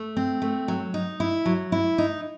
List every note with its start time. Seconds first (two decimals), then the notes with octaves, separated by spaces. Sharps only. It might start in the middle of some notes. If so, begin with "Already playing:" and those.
Already playing: A3
0.17 C4
0.42 A3
0.68 F#3
0.94 D#4
1.20 E4
1.46 F#3
1.72 E4
1.98 D#4